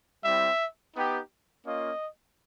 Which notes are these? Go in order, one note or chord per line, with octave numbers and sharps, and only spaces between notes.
G3 C4 E4 E5
B3 D#4 G4
A#3 C#4 F4 D#5